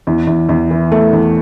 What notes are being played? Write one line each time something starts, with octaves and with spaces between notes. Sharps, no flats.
E2
E2
E2
E3
A3
E2